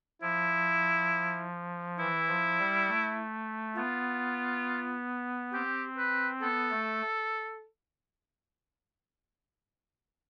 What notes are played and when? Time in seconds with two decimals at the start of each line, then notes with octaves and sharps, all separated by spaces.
0.22 F3 E4
1.99 E3 E4
2.28 F3
2.59 G3
2.88 A3
3.76 B3 F4
5.53 C4 G4
5.98 B4
6.41 B3 A4
6.71 A3